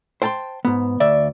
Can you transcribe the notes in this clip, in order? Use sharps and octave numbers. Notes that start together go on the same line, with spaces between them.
C5 G5 A5 B5 C6
G#2 B3
D2 D5 E5